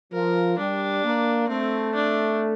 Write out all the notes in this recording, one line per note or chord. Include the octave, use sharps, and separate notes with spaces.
F3 A#4
G3 D4
A#3
A3 C4
D4